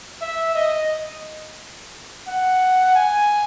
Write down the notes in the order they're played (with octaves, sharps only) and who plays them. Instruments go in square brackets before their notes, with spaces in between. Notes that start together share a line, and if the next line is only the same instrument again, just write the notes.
[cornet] E5
D#5
F#5
G#5